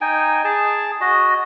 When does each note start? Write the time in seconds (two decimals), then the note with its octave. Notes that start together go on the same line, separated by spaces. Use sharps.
0.01 D#4 G5 G#5
0.44 G#4 A5
1.01 F#4 D#5